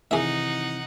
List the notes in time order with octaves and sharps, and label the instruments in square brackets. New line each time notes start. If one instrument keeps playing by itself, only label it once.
[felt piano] C3 D#3 E3 [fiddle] D#4 F#5 [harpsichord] G#4 E5